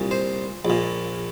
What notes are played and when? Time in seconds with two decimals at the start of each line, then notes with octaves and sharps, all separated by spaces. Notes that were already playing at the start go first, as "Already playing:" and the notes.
Already playing: C2 A#2
0.11 C5
0.65 A#1
0.70 A#2